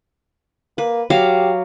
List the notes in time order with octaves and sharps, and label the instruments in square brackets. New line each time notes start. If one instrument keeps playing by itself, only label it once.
[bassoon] A#3 [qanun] B4
[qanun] F#3 F5 D6 [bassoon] G4